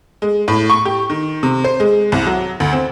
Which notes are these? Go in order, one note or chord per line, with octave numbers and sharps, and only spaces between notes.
G#3
A2
C#6
G4
D#3
C3
C5
G#3
C2
F#3
D2
C4